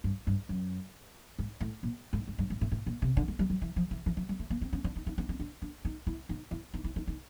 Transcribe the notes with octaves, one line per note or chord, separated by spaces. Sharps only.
G2
G2
F#2
G#2
A2
A#2
G#2
G#2
G2
G#2
A2
A2
A#2
C3
D3
G#3
G3
F#3
E3
F3
E3
E3
F3
G3
A3
A#3
C4
C#4
D4
D#4
D#4
D4
C#4
D4
D4
D#4
E4
D#4
E4
D#4
E4
D#4
D#4